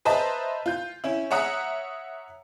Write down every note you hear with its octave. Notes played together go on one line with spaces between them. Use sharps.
B4 C5 D#5 E5 A5 A#5
F4 G6
C#4 E4
C#5 E5 F#5 A#5 D#6 F#6